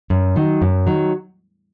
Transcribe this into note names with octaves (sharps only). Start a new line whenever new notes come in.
F#2
D#3 F#3
F#2
D#3 F#3